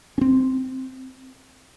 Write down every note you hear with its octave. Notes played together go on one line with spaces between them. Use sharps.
C4 C#4